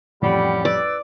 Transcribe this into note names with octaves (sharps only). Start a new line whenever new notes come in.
A1 F2 G3 F#5 G5 B5
B4 D5 E6